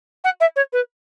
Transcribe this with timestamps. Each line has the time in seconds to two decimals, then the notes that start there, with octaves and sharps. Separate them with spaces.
0.24 F#5
0.40 E5
0.56 C#5
0.73 B4